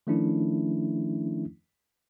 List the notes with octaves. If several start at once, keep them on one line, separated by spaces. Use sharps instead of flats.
D#3 F3 A3 C#4 D4 E4